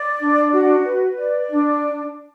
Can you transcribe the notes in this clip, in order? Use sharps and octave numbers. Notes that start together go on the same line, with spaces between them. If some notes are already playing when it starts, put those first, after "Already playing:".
Already playing: D5
D4
F#4
B4
D5
D4